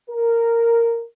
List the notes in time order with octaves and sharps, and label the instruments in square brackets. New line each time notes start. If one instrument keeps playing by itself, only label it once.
[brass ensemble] A#4